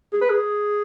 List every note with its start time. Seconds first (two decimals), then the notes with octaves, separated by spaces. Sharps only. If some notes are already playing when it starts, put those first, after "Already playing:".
0.13 G#4
0.21 B4
0.30 G#4